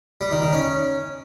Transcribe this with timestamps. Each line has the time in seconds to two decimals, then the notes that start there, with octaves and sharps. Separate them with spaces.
0.21 G3
0.31 D#3
0.42 D#3
0.53 C#4